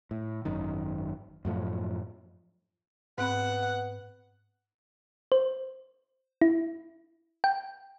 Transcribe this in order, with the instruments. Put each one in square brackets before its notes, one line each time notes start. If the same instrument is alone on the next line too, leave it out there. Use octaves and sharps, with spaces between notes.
[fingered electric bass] A2
G#1 F#2 D#3
F#2 A2 F3
[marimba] G#2 C4 B5 [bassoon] B3 [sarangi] F#5
[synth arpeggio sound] C5
E4
G5